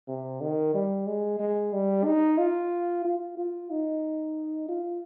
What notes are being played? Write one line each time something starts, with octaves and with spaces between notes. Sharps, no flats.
C3
D#3
G3
G#3
G#3
G3
D#4
F4
F4
F4
D#4
F4